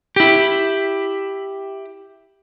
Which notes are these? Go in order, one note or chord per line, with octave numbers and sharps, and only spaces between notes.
E4 G4